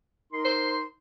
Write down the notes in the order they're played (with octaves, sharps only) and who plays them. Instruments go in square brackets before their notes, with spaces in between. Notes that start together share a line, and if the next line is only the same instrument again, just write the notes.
[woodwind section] D#4 A#4 C6
[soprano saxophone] C5